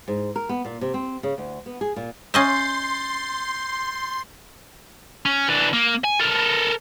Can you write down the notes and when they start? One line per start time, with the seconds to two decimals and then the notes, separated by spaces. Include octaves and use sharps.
0.08 G#2
0.36 A#4
0.49 B3
0.65 A#2
0.81 C3
0.94 C4
1.23 C#3
1.38 D2
1.66 B3
1.81 G#4
1.96 A#2
2.34 C#4 D#5 E5 C6 G6 A6 C7
5.26 C#4
5.49 E3 D4
5.73 A#3
6.04 G#5
6.20 A4 A#4